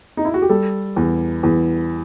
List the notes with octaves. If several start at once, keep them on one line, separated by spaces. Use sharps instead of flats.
D#4
E4
F#4
G4
G3 A4
E2
E2